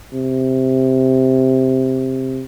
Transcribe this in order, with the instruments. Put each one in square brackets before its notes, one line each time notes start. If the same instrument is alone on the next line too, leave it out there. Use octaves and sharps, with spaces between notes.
[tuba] C3